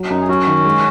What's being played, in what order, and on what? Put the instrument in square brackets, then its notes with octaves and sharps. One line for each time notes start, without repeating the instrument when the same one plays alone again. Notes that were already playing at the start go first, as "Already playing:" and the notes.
Already playing: [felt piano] F#3
[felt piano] F#2 [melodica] D#4
[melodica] G#4
[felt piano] F#3 [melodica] C#4 F#4
[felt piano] D#3
G#3